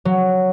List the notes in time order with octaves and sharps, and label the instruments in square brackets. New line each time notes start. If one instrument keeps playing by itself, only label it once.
[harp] F#3